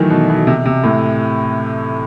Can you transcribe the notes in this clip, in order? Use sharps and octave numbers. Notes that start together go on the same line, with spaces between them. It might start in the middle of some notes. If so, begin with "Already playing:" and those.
Already playing: D#3 E3 F#3 A3
B2
B2
C3
C3
A2